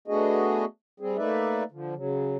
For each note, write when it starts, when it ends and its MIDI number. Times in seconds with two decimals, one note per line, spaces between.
0.08 0.65 57
0.08 0.65 59
0.08 0.65 62
0.08 0.65 66
0.08 0.65 68
0.08 0.65 75
1.00 1.17 55
1.00 1.17 60
1.00 1.17 68
1.17 1.64 57
1.17 1.64 58
1.17 1.64 63
1.17 1.64 71
1.17 1.64 74
1.17 1.64 76
1.71 1.95 50
1.71 1.95 53
1.95 2.37 49
1.95 2.37 54